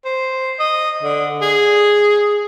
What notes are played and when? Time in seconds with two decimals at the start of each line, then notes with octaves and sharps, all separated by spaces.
0.05 C5
0.59 D#5
1.03 D3
1.42 G#4